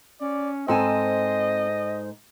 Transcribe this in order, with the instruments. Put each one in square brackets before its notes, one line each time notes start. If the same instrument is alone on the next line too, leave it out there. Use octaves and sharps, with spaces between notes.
[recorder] C#4 [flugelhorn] D5
[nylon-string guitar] G#2 A4 G#5 [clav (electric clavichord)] C4 [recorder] C5 [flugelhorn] D#5